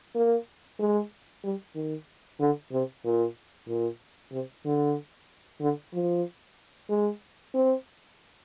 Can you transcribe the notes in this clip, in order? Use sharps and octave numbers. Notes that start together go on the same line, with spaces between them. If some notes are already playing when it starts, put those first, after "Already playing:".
A#3
G#3
G3
D#3
D3
C3
A#2
A#2
C3
D3
D3
F3
G#3
C4